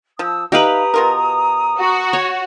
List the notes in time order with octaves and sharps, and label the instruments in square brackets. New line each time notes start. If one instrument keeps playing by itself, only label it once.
[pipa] F3 [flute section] A5 D#6 E6
[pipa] D#4 E5 F5 [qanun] G4 B4 [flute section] A#5 D#6
[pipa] B2 F4 A#4
[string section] F#4
[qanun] C#5